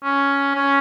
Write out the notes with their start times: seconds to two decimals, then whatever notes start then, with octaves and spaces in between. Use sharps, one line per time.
0.04 C#4
0.55 C#4